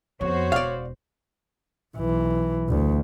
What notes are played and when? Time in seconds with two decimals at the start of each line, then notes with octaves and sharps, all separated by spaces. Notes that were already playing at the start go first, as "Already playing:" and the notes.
0.21 F2 B3 F#4 C5 C#5
0.52 E1 D5 F5
1.96 B1 E3
2.69 D2